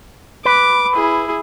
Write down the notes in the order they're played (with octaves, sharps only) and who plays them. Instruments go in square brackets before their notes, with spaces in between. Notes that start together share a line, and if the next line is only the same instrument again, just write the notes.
[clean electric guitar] B4 [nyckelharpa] D6
[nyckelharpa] E4 G#4